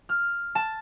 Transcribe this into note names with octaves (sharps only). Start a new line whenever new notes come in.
F6
A5